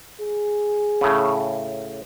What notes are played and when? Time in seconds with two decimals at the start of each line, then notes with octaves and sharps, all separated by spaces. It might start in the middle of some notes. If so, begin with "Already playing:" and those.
0.20 G#4
1.01 A2 C#3